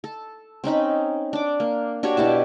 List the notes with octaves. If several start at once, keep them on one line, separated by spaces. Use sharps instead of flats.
A4
C4 C#4 D#4 B5
D4 D6
A#3
D4 F#4 G4 C#5
B2 E4 G4 A5